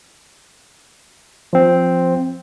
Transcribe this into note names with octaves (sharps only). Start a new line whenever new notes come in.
F3 C4